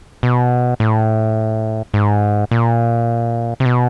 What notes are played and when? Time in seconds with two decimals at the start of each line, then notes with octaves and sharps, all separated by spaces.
0.23 B2
0.80 A2
1.94 G#2
2.51 A#2
3.60 C3
3.65 B2